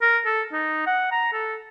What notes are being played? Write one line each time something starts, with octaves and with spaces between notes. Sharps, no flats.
A#4
A4
D#4
F#5
A#5
A4